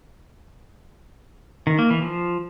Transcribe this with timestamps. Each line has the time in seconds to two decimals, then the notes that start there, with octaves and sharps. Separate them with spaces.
1.67 D#3
1.79 A#3
1.90 E3
2.02 F3